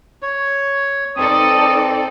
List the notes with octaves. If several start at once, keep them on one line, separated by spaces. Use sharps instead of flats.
C#5
C4 D#4 A4 B4 D5 A5 D#6